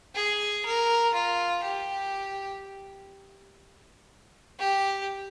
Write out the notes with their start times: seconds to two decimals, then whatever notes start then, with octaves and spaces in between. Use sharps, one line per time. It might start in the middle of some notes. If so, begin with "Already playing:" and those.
0.16 G#4
0.65 A#4
1.14 F4
1.63 G4
4.59 G4